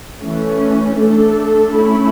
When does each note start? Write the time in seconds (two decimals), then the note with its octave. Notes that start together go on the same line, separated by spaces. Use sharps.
0.23 E3 A3 C#4
0.99 A3 D4 A4
1.75 A3 C#4 E4